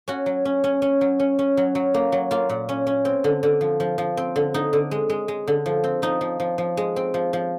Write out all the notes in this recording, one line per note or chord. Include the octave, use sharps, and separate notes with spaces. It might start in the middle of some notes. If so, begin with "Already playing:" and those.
C#4 F#4
F#3
C#4
C#4
C#4
F#3
C#4
C#4
F#3
F#3
A#3
F#3
A#3 F4
A#2
C#4
C#4
C4
D3
D3
F3
F3
F3
C4
D3
D3 D#4
D3
G#3
G#3
G#3
D3
F3
C4
F3 D#4
F3
F3
F3
G#3
C4
F3
F3